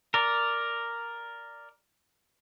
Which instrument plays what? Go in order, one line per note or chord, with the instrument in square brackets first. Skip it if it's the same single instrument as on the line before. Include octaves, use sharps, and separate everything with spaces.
[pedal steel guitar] A#4 D5